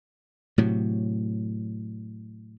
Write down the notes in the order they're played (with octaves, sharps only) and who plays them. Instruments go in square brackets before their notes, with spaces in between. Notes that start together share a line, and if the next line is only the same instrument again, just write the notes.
[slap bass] A2 C3 F#3